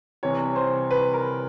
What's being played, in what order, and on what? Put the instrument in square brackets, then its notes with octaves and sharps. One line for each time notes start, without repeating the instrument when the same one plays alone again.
[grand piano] C2 C3 E3 [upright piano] C#5
[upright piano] C5
B4
A#4